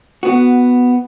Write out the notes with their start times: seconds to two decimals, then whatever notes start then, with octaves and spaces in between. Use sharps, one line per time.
0.23 B3 F#4